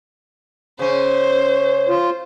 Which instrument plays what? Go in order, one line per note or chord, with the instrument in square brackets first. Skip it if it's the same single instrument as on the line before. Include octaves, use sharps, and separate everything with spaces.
[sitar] C#3 C#4 [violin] C5
[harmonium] F4